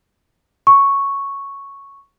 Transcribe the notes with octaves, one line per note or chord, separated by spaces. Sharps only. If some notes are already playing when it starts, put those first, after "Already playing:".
C#6